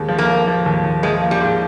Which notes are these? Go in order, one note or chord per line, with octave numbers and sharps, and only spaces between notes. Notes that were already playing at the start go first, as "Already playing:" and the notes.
Already playing: D#2 G#3
F3
A#3
F3
F3
D#2
D#2
F3 G#3
A#3
G3
G#2